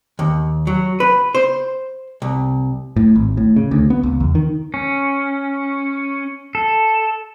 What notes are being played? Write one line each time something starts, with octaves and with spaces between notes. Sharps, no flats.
D#2
F#3
B4
C5
C2
A2
G#1
A2
C#3
D2
B3
C#2
E2
D#3
C#4
A4